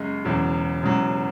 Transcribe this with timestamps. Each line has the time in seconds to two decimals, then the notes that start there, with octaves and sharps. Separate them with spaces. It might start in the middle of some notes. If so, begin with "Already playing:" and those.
Already playing: F#1 F#2 C#3 G#3
0.25 E1 E2 C#3 F#3
0.83 E1 E2 C#3 F#3